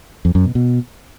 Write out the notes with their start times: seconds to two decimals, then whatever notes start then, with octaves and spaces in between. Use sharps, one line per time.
0.25 F2
0.35 F#2
0.45 B2
0.55 B2